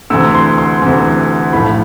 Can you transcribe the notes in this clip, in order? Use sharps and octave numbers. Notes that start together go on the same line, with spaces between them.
D2 C3 E3 E6
C6
C6
D2 C3 E3
B1 A2 F3 B5